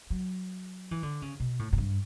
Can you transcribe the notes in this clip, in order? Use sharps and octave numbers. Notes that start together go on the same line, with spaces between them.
F#3
E3
D3
C#3
B2
A2
A2
G2